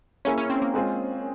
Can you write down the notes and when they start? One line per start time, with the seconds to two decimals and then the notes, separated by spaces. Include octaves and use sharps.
0.25 A#3 C#4 E4 G#4 C#5
0.38 C#4
0.50 C4
0.62 A#3
0.74 G#3 C4 F4 G#4